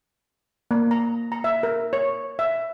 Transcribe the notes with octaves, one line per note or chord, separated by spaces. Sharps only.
A#3
A#5
A#5
E5
A#4
C#5
E5